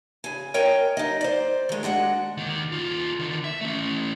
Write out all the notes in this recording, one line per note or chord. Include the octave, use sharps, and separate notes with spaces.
C#3 G#5
A#4 C#5 D#5 G5 G#5
D#4 D#5
C5 D5
D#3 G#3
G#3 D4 F#4 F#5
D#2 D#3
D#2 F4
D3 D#3
E5
A3 C#4